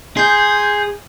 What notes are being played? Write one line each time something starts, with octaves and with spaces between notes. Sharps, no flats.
G#4 C6 G6